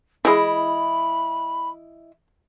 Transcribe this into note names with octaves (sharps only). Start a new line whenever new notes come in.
E3 G#3 E4 D#5 B5